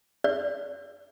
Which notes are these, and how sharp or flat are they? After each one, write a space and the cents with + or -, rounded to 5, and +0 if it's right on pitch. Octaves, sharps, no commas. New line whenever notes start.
D5 -35